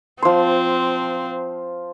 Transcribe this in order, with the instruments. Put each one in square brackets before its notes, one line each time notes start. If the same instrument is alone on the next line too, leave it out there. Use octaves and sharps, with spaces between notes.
[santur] F3 C6 [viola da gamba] C4